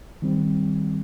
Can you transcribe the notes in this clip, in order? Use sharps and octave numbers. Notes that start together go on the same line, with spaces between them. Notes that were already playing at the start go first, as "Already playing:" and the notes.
D#3 G3 C4